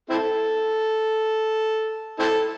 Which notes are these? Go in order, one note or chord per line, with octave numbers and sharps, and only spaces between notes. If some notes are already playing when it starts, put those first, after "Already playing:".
C4 E4 A4
C4 E4 A4